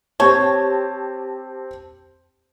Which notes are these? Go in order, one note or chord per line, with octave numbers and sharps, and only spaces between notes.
C4 G4 C#5 A5